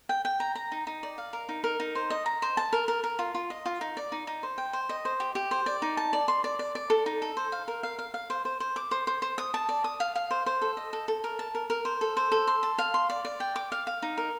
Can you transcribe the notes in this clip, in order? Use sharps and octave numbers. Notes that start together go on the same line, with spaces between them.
G5
G5
A#5
A#5
D#4
D#4
D5
F5
A#4
D#4
A#4
D#4
C5
D#5
A#5
C5
A5
A#4
A#4
A#4
F4
F4
D#5
F4
D#4
D5
D#4
D#4
C5
G5
C5
D#5
C5
G4
G4
C5
D5
D#4
A5
D5
C6
D5
D5
D5
A4
D#4
A4
C5
F5
A#4
F5
F5
F5
C5
C5
C5
D6
C5
C5
C5
D#6
A5
D5
D#6
F5
F5
C5
C5
A4
D#5
A4
A4
A#4
A5
A#4
A#4
C5
A4
C5
A4
C6
A5
F5
C6
D5
D5
G5
D6
F5
F5
D#4
A#4